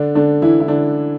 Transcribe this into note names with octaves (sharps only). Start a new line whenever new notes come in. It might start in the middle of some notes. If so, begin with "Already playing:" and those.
Already playing: D3 D4
D3 D4
E3 E4
E4
D3 D4